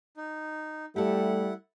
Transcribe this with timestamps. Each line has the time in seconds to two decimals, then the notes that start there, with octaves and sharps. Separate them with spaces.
0.17 D#4
0.96 G3 A3 E4 G4 A4 F#5